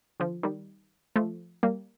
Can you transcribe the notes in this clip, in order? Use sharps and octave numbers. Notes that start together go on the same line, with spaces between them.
D3 F3
D#3 G3
F3 A3
G3 A#3